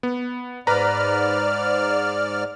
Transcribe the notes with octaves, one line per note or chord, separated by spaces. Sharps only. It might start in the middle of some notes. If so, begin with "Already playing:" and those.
B3
G#2 B4 D5 A#5 F6